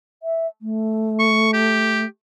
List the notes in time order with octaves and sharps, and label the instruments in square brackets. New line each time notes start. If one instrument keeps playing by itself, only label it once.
[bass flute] E5
A3
[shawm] C#6
G4